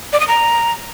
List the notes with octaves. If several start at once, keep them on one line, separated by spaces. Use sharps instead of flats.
D5
D#6
A#5